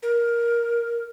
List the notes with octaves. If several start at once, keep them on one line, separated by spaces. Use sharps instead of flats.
A#4